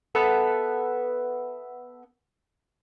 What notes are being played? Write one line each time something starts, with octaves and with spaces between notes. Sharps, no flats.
B3 A4 B4 E5